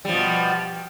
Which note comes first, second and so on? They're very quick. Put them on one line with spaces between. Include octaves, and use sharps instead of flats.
G3 F3 B2